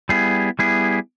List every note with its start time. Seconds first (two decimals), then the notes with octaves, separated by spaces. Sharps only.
0.09 G3 B3 E4 G#4
0.59 G3 B3 E4 G#4